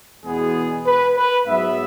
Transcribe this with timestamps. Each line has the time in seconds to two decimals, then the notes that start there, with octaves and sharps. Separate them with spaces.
0.25 E2 B2 G#3 B3 G#4
0.87 B4
1.17 B4
1.48 G#2 F#3 B3 E5